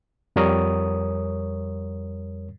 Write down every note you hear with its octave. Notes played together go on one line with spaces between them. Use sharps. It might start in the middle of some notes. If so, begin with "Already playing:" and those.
F2 G3 A#4 C#5 D#6